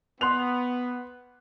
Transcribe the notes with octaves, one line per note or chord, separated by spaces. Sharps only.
B3 C6 F#6 F7